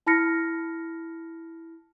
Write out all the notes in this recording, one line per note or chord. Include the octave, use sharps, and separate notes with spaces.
E4 A5 B5 F6 A#6 C#7